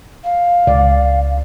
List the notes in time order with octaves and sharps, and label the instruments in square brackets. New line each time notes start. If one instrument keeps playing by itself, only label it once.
[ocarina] F5
[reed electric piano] C#2 [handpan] D5